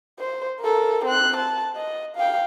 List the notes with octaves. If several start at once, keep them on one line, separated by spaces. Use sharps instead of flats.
C5
A4 A#4
C4 F#6
A5
D#5
F5 G5